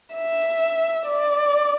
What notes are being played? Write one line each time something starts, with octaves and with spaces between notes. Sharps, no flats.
E5
D5